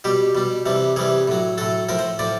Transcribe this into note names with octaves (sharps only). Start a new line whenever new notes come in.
B2 G3 G4
B2 G3
C3 E3 G3
C3 E3 G3 G#4
A2 F#3
A2 F#3 A4
A2 F3 A#4
C5
A2 F3 D5